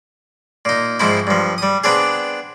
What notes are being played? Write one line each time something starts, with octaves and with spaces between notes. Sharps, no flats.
A#2 D#4
G#2 F3 C4 E4
G2 F3
G3 D#6
B3 C4 D4 G#4